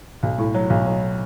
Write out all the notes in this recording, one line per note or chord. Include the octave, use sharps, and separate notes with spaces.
B1
A2
F#3
B1
F#3